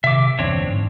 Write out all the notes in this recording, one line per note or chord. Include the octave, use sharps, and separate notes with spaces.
C3 D#3 E5 D6
G1 E2 C4 D4 C#5
G#2